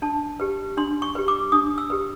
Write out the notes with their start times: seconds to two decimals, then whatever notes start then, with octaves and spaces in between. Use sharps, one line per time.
0.02 D4 A5
0.40 G4 B4
0.77 D4 C6
1.02 C#6
1.15 G4 B4
1.28 D6
1.52 D4 D#6
1.78 E6
1.90 G4 B4